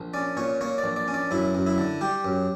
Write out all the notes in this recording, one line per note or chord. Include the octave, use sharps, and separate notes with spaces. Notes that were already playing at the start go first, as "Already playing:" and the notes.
Already playing: A#1
C#4 D5
A#2 C#5
A#3 C#5
D5
A#1
D5
C#4
D5
F#2 E4
F#2
E4
D3
G3 G4
F#2